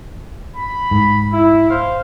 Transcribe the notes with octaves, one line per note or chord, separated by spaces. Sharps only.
B5
G#2
E4
C5 F5